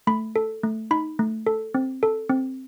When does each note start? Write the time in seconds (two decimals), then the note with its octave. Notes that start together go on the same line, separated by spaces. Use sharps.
0.07 A3 B5
0.36 A4
0.63 A3
0.91 D#4 B5
1.19 A3
1.47 A4
1.74 C4
2.03 A4
2.29 C4